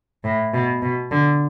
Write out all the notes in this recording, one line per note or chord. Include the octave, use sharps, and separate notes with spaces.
A2
B2
B2
D3